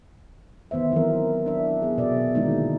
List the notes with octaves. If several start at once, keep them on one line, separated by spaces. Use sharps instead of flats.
D#3 B3 C5 E5
E3 F#3 B3 C4 A#4
D4 E5
B3 G#4
B2 D5 E5
D3 D#3 G#3 A#3 D#4 E4